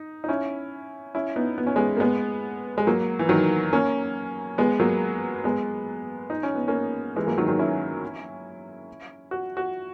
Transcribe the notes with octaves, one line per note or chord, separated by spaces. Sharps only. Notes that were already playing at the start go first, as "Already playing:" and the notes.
Already playing: D#4
D#4
C#4 E4
C#4 E4
B3 D#4
B3
C#4
G#3 B3
A#3
G#3 B3
G#3
F#3 A#3
E3
D#3 F#3
A#3 C#4
G#3 B3
F#3 A#3
G#3 B3
D#4
C#4
B3
A#3 C#4
E3 G#3
F#3 A#3
D#3 F#3
D#3 F#3
C#4 E4
F#4
F#4